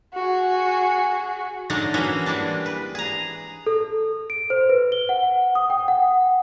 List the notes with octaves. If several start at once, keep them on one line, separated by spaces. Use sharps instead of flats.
F#4 G#4
D3 F#3 G#3 A3 D4 D#4
E3 A#3 C#4 F#4 G#4 E5
E3 G3 G#3 D4
B4
G#4 A#5
A4
D7
C5
B4
G7
F#5
D#6
G5
F#5